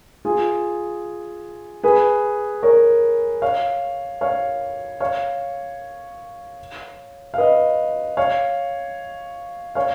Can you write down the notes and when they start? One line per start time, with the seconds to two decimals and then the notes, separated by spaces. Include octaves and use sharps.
0.25 F4 G#4
1.83 G#4 B4
2.63 A#4 C#5
3.42 C#5 F5
4.21 C#5 F5
5.00 C#5 F5
7.34 F5
7.38 B4 D#5
8.17 C#5 F5
9.75 C#5 F5